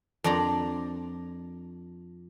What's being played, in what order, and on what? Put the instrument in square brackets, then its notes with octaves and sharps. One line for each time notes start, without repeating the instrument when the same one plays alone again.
[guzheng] F2 D4 D5 A#5 C6